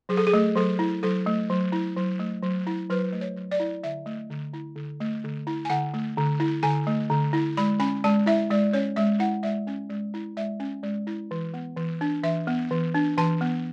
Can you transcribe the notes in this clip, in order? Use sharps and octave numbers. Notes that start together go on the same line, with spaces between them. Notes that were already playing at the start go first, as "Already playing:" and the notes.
F#3 G#4
A4
G#4
A3
F#3 A4
E4
F#3 A4
A3
F#3
E4
F#3
A3
F#3
E4
F#3 B4
A3
C#5
F#3
D5
E4
D3 E5
A3
D3
E4
D3
A3
D3
E4
G#5
D3 F#5
A3
D3
E4
D3 G#5
A3
D3
E4
G#3 B5
C#4 B5
G#3 A5
E4 E5
G#3 D5
C#4 C#5
G#3 E5
E4 F#5
G#3 E5
C#4
G#3
E4
G#3 E5
C#4
G#3
E4
E3
B3
E3
D4
E3 E5
B3
E3
D4
E3 A5
B3